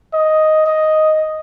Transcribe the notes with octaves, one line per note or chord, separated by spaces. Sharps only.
D#5
D#5